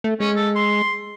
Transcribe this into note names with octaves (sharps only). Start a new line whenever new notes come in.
A3
G#3 C#4
A4
C6